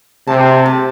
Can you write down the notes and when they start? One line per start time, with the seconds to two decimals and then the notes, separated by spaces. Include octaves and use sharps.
0.27 C3 A5
0.66 A5